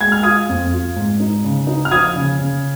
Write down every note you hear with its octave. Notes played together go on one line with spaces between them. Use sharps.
G#3 G#6
F6
F4 D#6 G#6
F2
F4
G#2
D#4
C#3
D#4
F6
F3 D#6 G#6
C#3
C#3